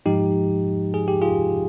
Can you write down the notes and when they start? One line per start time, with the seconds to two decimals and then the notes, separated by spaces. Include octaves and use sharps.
0.05 G#2 F3 G#3 D#4 G4
0.94 G#4
1.08 G4
1.22 F4 G#4